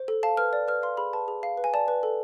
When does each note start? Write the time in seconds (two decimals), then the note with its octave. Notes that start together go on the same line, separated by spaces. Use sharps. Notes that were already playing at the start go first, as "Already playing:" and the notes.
Already playing: C5
0.08 A4
0.23 F5 A5
0.37 B4 F6
0.53 D5
0.68 B4 F6
0.83 F5 C6
0.97 G#4 B5
1.13 B4 A5
1.28 G#4
1.43 F5
1.57 B4
1.64 G#5
1.74 D5 A5
1.88 B4
2.03 A4